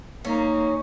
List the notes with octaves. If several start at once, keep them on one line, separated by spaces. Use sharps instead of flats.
A#3 C#4 D#4